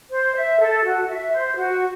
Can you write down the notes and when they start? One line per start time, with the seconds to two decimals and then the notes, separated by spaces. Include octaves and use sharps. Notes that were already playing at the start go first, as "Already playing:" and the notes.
0.10 C5
0.35 E5
0.59 A4
0.84 F#4
1.08 E5
1.32 C5
1.57 F#4